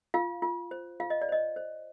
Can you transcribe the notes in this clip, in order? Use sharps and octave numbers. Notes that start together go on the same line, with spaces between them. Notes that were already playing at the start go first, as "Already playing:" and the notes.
F4 F5
F4
C5
F4 F5
D#5
D5
C5 D#5
C5